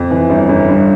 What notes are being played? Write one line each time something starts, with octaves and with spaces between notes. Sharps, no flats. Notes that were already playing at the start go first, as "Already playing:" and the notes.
Already playing: F2
E3
G1
G1
G2